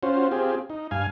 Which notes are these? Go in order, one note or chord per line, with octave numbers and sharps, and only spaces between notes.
C#4 F4 F#4 C5
C4 F4 G4 G#4
D#4
G2 F5 G#5